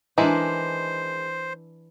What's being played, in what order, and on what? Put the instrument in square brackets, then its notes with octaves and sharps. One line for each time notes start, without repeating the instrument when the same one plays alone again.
[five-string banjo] D#3 G#3 E4 [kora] E3 D4 [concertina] C5